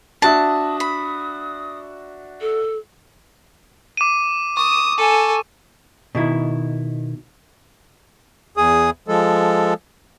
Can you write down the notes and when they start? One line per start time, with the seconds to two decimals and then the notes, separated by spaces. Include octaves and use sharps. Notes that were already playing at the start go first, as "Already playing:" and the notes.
0.22 D4 F#4 E5 A5 D#6
0.80 B5
2.40 A4
3.97 D6 D#7
4.57 C#6 D#6
4.98 A4 G#5
6.15 B2 D#3 E4
8.57 E2 G#4 D#6
9.08 F3 G#3 A4